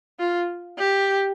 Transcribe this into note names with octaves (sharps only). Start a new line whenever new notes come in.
F4
G4